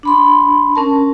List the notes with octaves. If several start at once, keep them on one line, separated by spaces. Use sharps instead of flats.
D4 B5 C6
C#4 A#4 A5